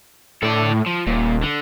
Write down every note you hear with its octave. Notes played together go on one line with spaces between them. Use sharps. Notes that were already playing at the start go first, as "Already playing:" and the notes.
A2 A4 D5
F3
D#1 A#2
D3